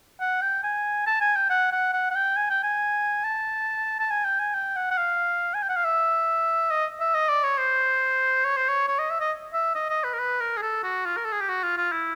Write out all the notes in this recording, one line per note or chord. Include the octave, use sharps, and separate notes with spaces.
F#5
G5
G#5
A5
G#5
G5
F#5
F#5
F#5
F#5
G5
G#5
G5
G#5
A5
A5
G#5
G5
G#5
G5
F#5
F#5
F5
G#5
G5
F#5
F5
E5
D#5
E5
D#5
D5
C#5
C5
C#5
C5
C#5
C#5
D#5
E5
D#5
E5
D#5
D#5
B4
A#4
B4
A#4
G#4
A4
F#4
F4
A#4
A4
G#4
G4
F#4
F4
F4
E4